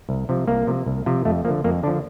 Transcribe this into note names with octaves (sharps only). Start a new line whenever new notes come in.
C2
C3 F3
C2 A#3
C3 F3
C2
C3 F3
F2 A3
D3 F3 A#3
F2 A#3
D3 F3 D4